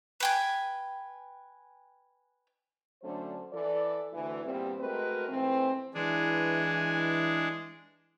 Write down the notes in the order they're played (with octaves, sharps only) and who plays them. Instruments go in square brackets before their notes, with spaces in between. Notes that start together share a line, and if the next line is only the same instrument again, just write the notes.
[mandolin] B4 G5 G#5
[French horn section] D3 F#3 A3 C#4 D4 C5
E3 A4 D5
D2 E3
E2 G2 A#2 G3 C4
G#3 A3 C4 F#4 A#4 B4
G#2 E3 A3 C4
[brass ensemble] E3 [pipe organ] G#3 D4 G#4